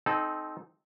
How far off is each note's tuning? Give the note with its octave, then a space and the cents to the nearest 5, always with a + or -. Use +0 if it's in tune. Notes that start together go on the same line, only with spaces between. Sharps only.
C4 +0 D#4 +0 A4 -30